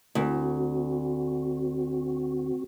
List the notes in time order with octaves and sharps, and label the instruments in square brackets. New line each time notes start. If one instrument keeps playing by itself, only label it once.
[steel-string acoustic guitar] D2 [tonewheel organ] C4 F#4